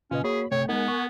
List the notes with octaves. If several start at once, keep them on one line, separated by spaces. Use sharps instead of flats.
A#2 C#3 C#4 F4 B4 D#5 G#5
A#3 F#4 G#4 C#5 B5
G1 C3 A3 C#5 G5
G#3 B3 D#4 A#4 F#5 G#5
C#6